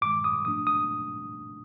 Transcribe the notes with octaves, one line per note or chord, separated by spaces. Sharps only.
G2 D#3 G#3 D6
D#6
G#2 F3 A3 D4 D#6
D#6